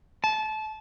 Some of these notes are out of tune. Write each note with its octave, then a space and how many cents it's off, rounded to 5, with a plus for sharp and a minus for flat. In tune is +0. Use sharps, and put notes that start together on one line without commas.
A5 -25